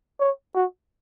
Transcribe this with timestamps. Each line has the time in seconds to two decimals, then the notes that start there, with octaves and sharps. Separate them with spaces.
0.20 C#5
0.54 F#4